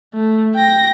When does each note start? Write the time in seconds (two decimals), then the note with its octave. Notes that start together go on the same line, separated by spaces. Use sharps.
0.14 A3
0.55 G5 A#6